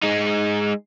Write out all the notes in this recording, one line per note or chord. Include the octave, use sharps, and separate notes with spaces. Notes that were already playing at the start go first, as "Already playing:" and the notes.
G#3 D#4